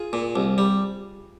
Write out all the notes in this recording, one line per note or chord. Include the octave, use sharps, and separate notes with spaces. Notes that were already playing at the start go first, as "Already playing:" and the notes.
Already playing: F4 G#4
A#2
C2
G3